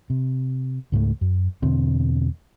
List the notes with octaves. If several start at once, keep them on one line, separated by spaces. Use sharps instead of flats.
C3
C#2 G#2 G3 A3
F#2
E2 B2 D3 C4